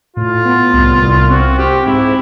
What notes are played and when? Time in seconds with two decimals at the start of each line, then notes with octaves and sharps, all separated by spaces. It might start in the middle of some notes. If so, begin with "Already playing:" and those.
0.16 A2 F4
0.45 B3
0.73 C2
1.01 C2
1.30 C4 F#4
1.58 C4 G4
1.86 G#2 E4